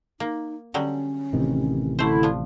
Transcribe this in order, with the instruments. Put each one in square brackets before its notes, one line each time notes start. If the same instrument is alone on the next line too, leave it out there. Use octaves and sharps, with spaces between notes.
[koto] A#3 [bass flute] D#4
[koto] D3 F#3 G3 [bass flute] C#4
[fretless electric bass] A1 C3 D#3
[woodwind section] D3 E4 [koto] A3 C5
[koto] F3 D4